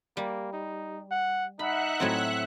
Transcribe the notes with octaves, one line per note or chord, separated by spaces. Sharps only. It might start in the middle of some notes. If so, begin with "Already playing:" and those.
G3 A#3
D#4
F#5
D#4 E5 F#5 B5 F#6
A2 F#3 C4